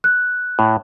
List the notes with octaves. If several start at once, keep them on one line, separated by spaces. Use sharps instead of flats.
F#6
A2